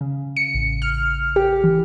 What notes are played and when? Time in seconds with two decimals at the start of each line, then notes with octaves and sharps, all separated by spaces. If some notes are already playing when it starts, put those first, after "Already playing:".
0.01 C#3
0.37 C#7
0.54 A1
0.82 F6
1.36 G4
1.64 E3